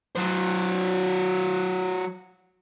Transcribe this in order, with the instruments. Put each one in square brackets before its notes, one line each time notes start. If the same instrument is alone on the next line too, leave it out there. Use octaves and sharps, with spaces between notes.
[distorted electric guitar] F#3 C5